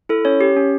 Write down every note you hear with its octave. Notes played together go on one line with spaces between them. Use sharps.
E4 A4
C#4 C#5
G4
C#4